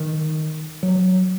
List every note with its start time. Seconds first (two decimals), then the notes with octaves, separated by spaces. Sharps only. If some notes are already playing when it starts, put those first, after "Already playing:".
Already playing: D#3
0.83 F#3